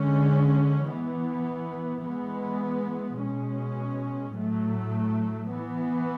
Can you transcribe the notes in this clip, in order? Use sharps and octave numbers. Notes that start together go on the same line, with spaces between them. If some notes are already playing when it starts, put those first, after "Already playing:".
Already playing: D3 G#3 C#4
E3 B3
E3 G#3 B3
B2 G#3 C#4
A2 F#3 A3
E3 B3